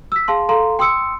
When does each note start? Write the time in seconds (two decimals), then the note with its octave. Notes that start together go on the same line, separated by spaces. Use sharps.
0.12 E6 B6
0.28 G#4 F5 A5 C6
0.49 A4 F5 A#5 C6
0.79 G5 C6 D#6 E6 C#7